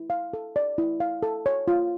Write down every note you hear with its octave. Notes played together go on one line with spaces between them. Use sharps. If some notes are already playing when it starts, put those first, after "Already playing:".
Already playing: E4
F5
A4
D5
E4
F5
A4
C#5
F4